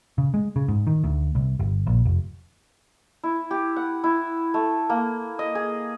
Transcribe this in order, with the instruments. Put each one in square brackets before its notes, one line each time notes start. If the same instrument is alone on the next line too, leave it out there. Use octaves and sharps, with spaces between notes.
[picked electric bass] C#3
G#3
C#3
G#2
D#3
D2
C2
G1
A#1
F1
[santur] E4
G4
F#5
E4
A3
A#3
D#5
G#4